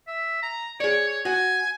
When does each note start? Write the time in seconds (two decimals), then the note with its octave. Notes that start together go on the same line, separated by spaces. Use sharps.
0.07 E5
0.43 A#5
0.80 G#4 C#5 D5
1.08 C#5
1.25 F#4 G#5